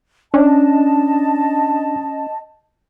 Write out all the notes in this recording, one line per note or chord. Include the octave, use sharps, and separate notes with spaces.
C#4 D4 D#5 A5